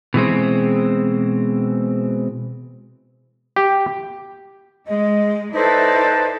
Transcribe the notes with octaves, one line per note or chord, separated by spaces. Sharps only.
B2 E3 G#3 C4
G4
G#3 D#5
D#4 E4 A4 B4 C5 D5 A5